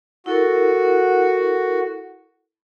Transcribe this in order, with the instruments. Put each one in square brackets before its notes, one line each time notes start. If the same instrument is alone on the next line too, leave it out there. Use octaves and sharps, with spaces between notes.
[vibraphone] E4 A4 A#4 [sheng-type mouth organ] F#4